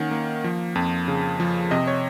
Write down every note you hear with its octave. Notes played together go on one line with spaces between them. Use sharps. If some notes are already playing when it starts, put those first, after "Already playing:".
Already playing: D#3 A#3 C#4 F#5
A#3
F3
F2
C#3
F3
C3 D#5
C#5